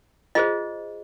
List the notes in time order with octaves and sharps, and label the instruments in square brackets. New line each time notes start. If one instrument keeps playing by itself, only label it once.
[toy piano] F4 G#4 C5 D#5